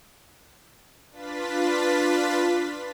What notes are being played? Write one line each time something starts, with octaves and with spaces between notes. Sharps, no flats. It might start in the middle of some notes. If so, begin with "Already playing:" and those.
D4 F4 B4 A6 B6